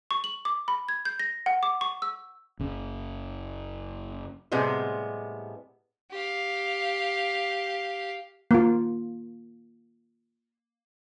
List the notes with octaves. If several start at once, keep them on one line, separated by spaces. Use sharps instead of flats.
C#6
F#7
D6
B5
G#6
G6
A#6
F#5
D6
C#6
E6
F#1 C#3
A2 C3 G3 G#3 B3
G4 F5
A#3 F4